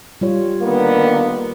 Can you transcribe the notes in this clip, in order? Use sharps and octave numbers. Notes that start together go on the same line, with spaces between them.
G3 F4 C#5
D3 D#3 A#3 B3